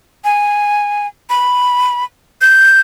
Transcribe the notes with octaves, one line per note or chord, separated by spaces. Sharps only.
G#5
B5
G6